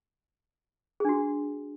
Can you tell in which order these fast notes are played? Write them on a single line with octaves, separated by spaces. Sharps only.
G#4 D4 F#4